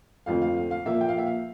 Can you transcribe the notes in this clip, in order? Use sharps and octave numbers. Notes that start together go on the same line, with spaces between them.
F2 D3 F3 A3 C4 F5
F5
F5
F5
A#2 F3 A#3 E5
G5
F5
E5
F5